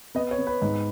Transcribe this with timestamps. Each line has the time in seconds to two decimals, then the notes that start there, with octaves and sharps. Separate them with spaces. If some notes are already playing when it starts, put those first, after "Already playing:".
0.15 B3 D#5
0.31 C#5
0.38 B3
0.47 B4
0.62 G#2